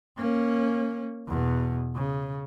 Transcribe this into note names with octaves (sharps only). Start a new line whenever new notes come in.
A#3 C#4
E2 B2
C#3